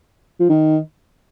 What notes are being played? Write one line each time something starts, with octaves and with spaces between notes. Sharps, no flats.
F3
D#3